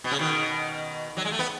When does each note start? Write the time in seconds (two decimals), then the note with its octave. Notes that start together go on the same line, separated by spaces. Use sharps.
0.04 B2
0.11 C#3
0.19 B2 D#3
1.17 F#3
1.25 G#3
1.31 A3
1.39 B3